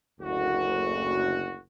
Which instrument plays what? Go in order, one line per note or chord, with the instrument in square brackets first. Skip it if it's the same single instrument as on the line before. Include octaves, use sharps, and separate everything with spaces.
[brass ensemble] F#1 D2 F#4